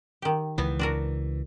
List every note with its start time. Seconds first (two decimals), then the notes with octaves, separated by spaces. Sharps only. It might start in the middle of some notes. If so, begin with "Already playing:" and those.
0.22 D#3 G4
0.58 C#2 E3 B3
0.79 D4 F#4 A#4